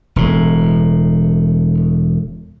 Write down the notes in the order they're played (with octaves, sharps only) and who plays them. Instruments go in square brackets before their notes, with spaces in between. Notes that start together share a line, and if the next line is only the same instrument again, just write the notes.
[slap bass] E1 A2